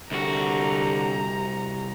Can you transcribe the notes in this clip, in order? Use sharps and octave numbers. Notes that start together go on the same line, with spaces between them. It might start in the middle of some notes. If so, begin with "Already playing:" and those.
C2 D3 F#4 G4 A#5